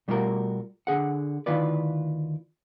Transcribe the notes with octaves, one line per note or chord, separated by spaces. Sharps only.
B2 G3 A3 F4 F#4 A#4
D3 G#4 F#5
D2 D#3 E4 F4 B4 D5